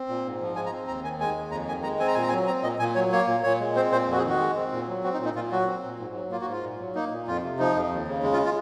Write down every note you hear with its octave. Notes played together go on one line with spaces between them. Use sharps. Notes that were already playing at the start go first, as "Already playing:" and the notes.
Already playing: C4
A#2
G#2
F3
G#3 G#5
A#5
C4
D#2 A#5
D#3 G#5
G#3 G#5
D#2
F2 A#5
D#3 G#5
G#3 A#5
C4 G#5
A#5
A#2 G#5
A#5
G#5
F#3
C4 A#5
A#2 D#5
A#2 G#5
F#3 C#5
A#3 C#5
A#2
A#2 C#5
G#3
C4 C5
A#2 C5
F2
F#4
G#4
D#3 F#4
G#3
C4
A#2
F#3
C4 F#4
D#4
A#2
D#4
A#2 F4
F#3 F#4
C4
A#2
G#2
F#3
A#3 F4
F#4
G#2
F4
A#2
F#3
A#3 D#4
A#2
F2 F4
C3
F3 D#4
F2
D#2
C#3
G#3
F4
F4